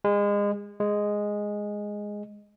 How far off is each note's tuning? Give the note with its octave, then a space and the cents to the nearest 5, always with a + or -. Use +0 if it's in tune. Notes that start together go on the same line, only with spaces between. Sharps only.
G#3 -30
G#3 -5